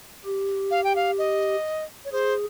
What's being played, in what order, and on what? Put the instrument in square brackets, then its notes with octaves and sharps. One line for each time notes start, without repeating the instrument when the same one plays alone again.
[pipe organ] G4
[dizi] F5
G5
F5
D#5
C#5
[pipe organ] G#4 [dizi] C5